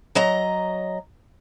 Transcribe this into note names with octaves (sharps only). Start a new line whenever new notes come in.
F#3 D#5 A#5